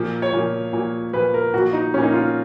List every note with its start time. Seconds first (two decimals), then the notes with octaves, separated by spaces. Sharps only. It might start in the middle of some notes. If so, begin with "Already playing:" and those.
Already playing: A#2 F3
0.22 C#5
0.33 A#2 F3
0.73 A#2 F3
1.13 A#2 F3 B4
1.34 A#4
1.54 A#2 F3 F#4
1.73 D#4
1.94 A#2 F3 C#4
2.04 D#4
2.13 F4